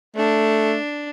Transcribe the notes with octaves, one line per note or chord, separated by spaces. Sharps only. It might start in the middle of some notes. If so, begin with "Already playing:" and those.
A3 D4